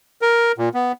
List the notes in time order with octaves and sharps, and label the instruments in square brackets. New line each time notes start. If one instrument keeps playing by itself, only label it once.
[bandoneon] A#4
A#2
B3